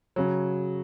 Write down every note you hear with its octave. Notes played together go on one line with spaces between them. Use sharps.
C#3 F#3